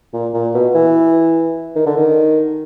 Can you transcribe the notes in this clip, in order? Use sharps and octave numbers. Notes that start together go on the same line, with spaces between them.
A#2
A#2
B2
E3
D#3
D3
D#3